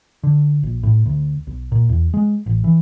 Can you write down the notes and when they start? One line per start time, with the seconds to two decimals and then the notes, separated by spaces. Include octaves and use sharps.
0.24 D3
0.63 A#1
0.83 A2
1.06 D2
1.47 B1
1.72 A#2
1.89 E2
2.14 G#3
2.46 A1
2.64 E3